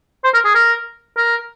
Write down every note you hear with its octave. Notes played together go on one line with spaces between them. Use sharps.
C5
A#4
G#4
A#4
A#4